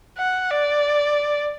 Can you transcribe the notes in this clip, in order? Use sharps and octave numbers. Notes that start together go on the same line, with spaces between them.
F#5
D5